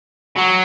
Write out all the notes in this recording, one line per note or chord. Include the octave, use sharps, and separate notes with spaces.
F#3